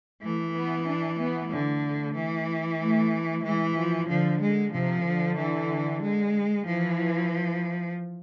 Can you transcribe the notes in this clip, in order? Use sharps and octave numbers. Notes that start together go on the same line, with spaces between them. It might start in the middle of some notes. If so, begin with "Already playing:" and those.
E3 A3
B3
D4
B3
D3 A3
E3
A3
E3 G#3
F3
D3 F3
G#3
C3 F3
D3
E3
G#3
E3 F3